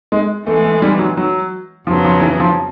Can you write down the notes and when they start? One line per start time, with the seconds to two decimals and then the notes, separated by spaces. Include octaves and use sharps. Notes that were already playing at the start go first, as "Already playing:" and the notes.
0.12 G#3
0.47 E3 G#3 A3 B3
0.64 A3
0.82 G3
0.99 F#3
1.17 F#3
1.87 F2 C#3 F3 F#3 B3
2.04 F3
2.21 E3
2.40 F3